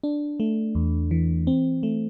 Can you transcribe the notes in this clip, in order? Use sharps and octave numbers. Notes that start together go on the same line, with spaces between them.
D4
A3
E2
E3
C4
A3